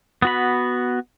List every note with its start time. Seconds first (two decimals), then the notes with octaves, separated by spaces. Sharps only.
0.22 B3 F#4 B5